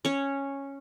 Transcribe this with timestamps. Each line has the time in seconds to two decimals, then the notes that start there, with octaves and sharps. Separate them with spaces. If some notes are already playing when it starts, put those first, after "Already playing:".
0.05 C#4 C#5